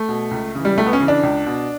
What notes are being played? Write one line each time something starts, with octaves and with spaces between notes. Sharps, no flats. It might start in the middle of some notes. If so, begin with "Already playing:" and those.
Already playing: A3
B2
C#2
C#3 E3
G3
C#2 A3
B3
C#4
C#3 E3
D4
C#2
B2